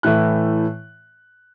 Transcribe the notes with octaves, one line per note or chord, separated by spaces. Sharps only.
A2 E3 A3 F#6